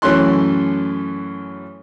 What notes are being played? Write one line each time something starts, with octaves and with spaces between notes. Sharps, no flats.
F#2 E3 A3 C#4 C6 F#6